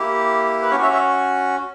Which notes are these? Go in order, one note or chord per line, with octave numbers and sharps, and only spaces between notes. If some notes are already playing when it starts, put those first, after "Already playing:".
Already playing: A#3 E4 G4
B4
C#4 F#4 A#4 C#5
C#5 E5
C#5 E5